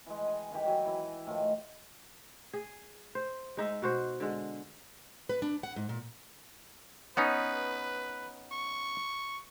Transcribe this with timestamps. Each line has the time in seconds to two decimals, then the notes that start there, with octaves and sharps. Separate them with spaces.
0.06 E3 G#3
0.27 G#5
0.51 D#3 E3 G4
0.65 F#3 G#5
0.85 E3 E4
1.27 A2 D#3 F3
2.53 G#4
3.15 C5
3.57 G#3 D#4 E5
3.82 B2 F#4 C5
4.20 D3 G#3
5.29 B4
5.42 D4
5.63 F#5
5.76 G#2
5.89 A#2
7.17 B3 C#4 D#4 B4
8.52 C#6